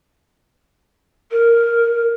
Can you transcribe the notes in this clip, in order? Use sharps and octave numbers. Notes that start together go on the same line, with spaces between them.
A#4